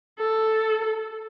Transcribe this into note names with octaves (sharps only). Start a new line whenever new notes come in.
A4